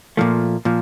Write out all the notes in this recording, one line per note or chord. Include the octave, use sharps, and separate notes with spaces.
A#2 F3 A3
A#2 F3